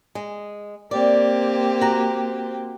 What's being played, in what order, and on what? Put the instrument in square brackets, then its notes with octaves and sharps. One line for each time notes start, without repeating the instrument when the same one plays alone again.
[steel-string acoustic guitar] G#3
[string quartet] A#3 C4 G4 [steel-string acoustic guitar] D5
[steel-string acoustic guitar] F#4 A#5